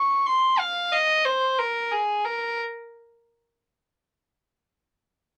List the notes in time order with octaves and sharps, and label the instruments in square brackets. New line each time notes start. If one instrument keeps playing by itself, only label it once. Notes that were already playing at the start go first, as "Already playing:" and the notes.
Already playing: [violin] C#6
C6
F5
D#5
C5
A#4
G#4
A#4